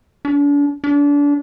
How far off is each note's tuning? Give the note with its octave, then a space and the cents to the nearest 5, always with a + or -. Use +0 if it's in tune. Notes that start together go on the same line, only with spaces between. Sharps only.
D4 -40
D4 -30